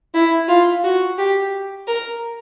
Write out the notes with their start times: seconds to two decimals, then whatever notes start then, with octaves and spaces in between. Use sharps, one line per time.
0.14 E4
0.48 F4
0.84 F#4
1.18 G4
1.87 A#4